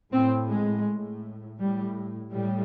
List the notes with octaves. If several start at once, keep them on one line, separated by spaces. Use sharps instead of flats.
A2 C4
G#3
A2
A2 G3
A2 G3